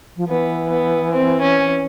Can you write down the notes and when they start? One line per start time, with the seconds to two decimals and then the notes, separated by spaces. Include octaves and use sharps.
0.17 F3
0.28 E3 B3
0.70 B3
1.13 C4
1.41 C#4